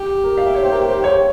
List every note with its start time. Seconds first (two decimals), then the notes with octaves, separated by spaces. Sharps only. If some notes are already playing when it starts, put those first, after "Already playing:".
Already playing: G4
0.24 A#4
0.38 F5
0.46 E5
0.55 C#5
0.63 C5
0.72 A#4
0.88 C5
1.04 C#5